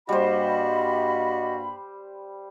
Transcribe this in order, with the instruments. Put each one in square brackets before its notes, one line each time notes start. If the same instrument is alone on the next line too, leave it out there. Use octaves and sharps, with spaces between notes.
[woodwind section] G2 A#3 B5 [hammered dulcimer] G3 C5 [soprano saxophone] F#4 [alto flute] D#5